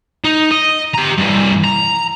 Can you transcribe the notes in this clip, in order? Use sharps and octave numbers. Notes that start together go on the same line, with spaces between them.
D#4
D#5
G4 A#5
G2 E3
A#5